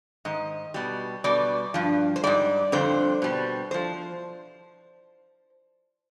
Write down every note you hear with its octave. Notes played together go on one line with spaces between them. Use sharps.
G#2 D#3 D#5
B2 G3
B2 G3 D5
G2 F3
C5
G#2 G3 D5
F2 D3 G3 C5
B2 G3
F3 C5